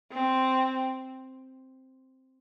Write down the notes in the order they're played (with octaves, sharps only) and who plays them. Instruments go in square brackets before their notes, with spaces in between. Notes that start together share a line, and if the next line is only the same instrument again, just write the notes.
[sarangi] C4